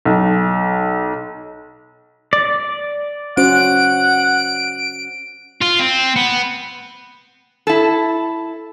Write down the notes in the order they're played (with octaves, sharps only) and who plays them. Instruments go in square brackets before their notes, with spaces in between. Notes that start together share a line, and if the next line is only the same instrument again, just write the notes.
[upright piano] B1
[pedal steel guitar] D5
[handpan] C#4 F#4 C5 [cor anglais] F#5 [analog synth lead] D7
[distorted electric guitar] F4
C4
B3
[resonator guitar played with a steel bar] E4 A4